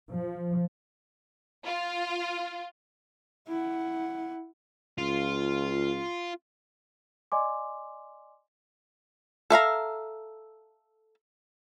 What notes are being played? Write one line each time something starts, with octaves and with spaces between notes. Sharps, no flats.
F3
F4
E4 F#5
C#2 F4
D5 D#5 G#5 C6 D6
A4 E5 F5 A#5